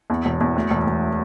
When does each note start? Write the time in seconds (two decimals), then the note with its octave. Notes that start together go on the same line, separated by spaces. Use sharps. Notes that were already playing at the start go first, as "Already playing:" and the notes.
0.10 E2
0.25 E1
0.41 E2
0.56 D2
0.71 E1
0.86 E1